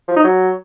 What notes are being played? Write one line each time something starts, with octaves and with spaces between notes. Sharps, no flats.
F3
D#4
F#3